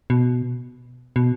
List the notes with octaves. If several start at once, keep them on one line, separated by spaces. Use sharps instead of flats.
B2
B2